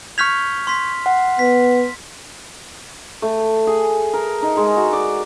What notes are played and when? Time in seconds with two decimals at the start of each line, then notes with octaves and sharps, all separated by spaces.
0.18 C#6 F6 G6 G#6 B6 F7
0.67 C6 B6
1.06 F#5
1.39 B3 B6
3.22 A3
3.67 G#4
4.14 A#4
4.42 D#4
4.57 G#3
4.77 F#4
4.93 D5